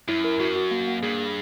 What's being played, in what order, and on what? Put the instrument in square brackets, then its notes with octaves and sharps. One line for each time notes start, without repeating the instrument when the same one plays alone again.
[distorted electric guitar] F#2 [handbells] E4
[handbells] A#4
[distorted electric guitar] F#2 [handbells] F#4
[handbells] F#4
A#3
A#3
[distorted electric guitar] G2 [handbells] G#4
[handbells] G#4